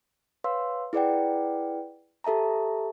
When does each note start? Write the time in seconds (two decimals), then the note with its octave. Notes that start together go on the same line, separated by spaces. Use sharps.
0.44 B4 C#5 F5 C6 E6
0.93 E4 G#4 B4 D5 F#5 G5
2.24 G4 A4 E5 A5 A#5